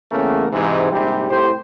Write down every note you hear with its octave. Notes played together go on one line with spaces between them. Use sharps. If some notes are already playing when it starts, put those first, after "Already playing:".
E2 C#3 A3 A#3 C#4 A#4
G#2 C3 E3
A#1 G#2 C3 G3
C2 A2 G4 C5